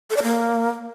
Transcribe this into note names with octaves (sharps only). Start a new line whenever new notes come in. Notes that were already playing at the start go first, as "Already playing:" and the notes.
A4
D5
A#3